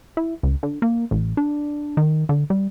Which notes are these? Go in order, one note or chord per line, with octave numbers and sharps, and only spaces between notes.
E4
C#2
D3
A#3
A1
D4
D#3
D3
G3